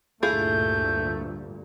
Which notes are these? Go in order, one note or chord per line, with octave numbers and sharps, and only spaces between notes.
D2 G2 A#2 A3 E4 F4 G#4 G6